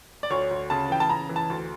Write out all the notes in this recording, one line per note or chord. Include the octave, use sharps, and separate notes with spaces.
D5
D2 C#5
D2
C#3 A5
E3 G5
A5
C#3 A#5
E3
A5
D2